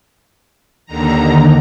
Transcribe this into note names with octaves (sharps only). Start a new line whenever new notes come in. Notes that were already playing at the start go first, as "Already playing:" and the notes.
D#2 D3 D#3 A#5